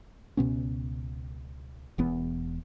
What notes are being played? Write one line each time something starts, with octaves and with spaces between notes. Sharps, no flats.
C#2 B2 B3 C#4
E1 E2 B3